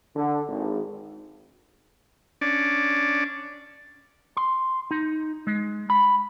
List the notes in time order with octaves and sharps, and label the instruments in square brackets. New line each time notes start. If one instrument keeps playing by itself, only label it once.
[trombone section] D3
G#1
[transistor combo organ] C#4 D4 D5
[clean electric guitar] C6
D#4
G#3
B5